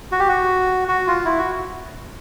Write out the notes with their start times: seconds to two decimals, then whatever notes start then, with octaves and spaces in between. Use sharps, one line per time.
0.12 F#4
0.19 G4
0.29 F#4
0.88 F#4
1.07 F4
1.25 E4
1.38 F#4